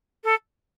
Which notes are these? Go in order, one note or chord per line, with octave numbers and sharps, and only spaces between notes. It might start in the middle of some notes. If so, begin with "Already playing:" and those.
A4